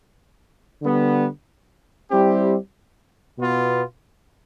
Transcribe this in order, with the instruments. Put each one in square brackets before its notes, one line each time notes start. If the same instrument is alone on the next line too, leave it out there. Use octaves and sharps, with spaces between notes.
[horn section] D3 G3 B3
G3 C4 E4 G4
B2 B3 F4